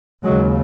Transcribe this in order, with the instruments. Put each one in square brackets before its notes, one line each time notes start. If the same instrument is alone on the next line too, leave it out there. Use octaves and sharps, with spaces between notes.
[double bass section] D#2 C#3 F#3 G#3